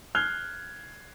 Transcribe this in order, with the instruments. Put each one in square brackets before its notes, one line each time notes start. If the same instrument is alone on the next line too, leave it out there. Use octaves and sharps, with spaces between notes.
[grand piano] F6 F#6 G#6 C7 F7 G7